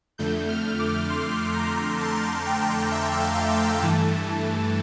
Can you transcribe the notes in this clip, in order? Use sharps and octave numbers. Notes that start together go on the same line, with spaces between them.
F2 D3 A3 G6
F6
D6
C6
A#5
A5
G5
E5
F5
F5
G2 E3 A3 A5